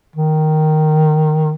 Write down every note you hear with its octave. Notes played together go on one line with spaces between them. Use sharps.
D#3